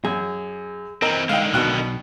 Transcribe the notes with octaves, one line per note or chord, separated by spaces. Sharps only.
F#2 G#4
E3 C4 A#4 D#5 A#5
D3 D#3 G#3 F5 G5
B1 B2 G5 F#6